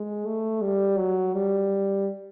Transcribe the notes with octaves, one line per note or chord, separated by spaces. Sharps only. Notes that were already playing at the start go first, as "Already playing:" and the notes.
Already playing: G#3
A3
G3
F#3
G3